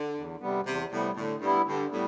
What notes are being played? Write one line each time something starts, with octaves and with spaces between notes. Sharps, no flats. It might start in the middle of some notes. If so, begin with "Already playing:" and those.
Already playing: D3
E2
C3 G3 B3
E2 C3
A2 C3 G3 B3
A2 D3
G2 G3 B3 E4
G2 D3
A2 G3 B3